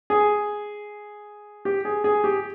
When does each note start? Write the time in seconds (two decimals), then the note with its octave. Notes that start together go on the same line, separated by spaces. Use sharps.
0.10 G#4
1.65 G4
1.85 G#4
2.04 G#4
2.24 G4